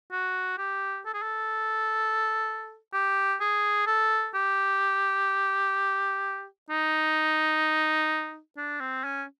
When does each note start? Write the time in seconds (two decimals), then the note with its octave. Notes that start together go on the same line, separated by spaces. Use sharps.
0.12 F#4
0.58 G4
1.06 A4
1.14 G#4
1.22 A4
2.93 G4
3.41 G#4
3.87 A4
4.34 G4
6.70 D#4
8.57 D4
8.80 C4
9.04 C#4